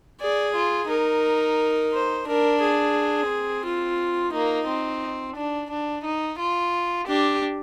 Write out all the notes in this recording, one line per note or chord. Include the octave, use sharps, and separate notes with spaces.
G#4 D5
F4
D#4 A#4
C5
D4 A#4
G#4
C4
F4
A#3 D#4
C4
D4
D4
D#4
F4
D4 G4